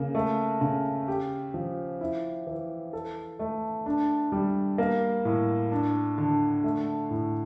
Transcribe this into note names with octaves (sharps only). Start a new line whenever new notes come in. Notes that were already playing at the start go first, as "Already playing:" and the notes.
Already playing: C#3 A#3
A3
C#3
G4
F3
E4
E3
A4
A3
D4
G3
A#3
A2
D4
D3
A3
A2